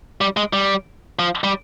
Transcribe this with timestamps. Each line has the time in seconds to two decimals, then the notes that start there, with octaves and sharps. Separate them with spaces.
0.21 G3
0.37 G#3
0.53 G3
1.19 F3
1.44 G3